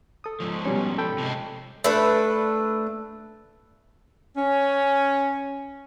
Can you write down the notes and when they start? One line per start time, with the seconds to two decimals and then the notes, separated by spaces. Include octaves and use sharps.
0.24 A4 D#6
0.40 G#2 F3
0.66 B2 G3 C#4
0.98 A4 G5 B5
1.18 C3 G#3
1.84 A3 D4 B4
4.36 C#4